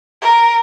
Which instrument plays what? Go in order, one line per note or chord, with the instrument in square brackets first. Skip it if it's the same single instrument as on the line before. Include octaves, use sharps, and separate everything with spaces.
[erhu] A#4